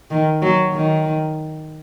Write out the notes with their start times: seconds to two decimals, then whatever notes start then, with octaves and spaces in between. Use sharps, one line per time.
0.11 D#3
0.42 F#3
0.72 D#3